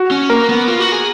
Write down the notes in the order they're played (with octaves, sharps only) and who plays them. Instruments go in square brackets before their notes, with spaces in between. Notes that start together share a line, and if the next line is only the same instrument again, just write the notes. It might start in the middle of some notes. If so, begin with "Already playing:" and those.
Already playing: [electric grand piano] F#4
[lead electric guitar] C#4
[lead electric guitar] A#3 [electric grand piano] A#4
[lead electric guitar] B3
F4
F#4
G#4